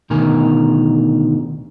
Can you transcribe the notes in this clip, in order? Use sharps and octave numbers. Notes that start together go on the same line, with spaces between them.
D2 B2 D#3 A#4 G#5